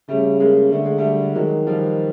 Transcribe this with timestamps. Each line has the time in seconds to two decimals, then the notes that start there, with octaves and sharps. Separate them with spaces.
0.08 C#3 G3 A3
0.40 G#3 A#3
0.72 D3 A3
0.85 G#3
0.98 G3 A3
1.35 D#3 F#3 G#3
1.67 F3 G3